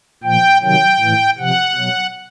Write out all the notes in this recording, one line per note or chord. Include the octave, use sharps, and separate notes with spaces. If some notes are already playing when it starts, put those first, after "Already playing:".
A#2 F3 G5
C3 D#3 F#3 G5
A2 E3
C3 F3 F#5
B2 F#3